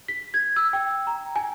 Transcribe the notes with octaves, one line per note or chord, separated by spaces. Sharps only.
B6
G#6
E6
G5
A#5
G#5